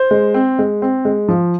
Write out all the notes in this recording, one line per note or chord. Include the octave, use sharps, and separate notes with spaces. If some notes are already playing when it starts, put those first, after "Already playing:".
Already playing: C5
G#3
C4
G#3
C4
G#3
F3